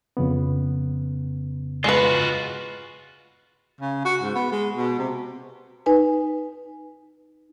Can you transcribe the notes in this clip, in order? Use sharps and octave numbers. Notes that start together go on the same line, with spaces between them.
F2 C#3 B3
G#3 F4 F#4 B4
C#3
F#4
G#2
B3
G#3
B2
C3
D#4 B4 G#5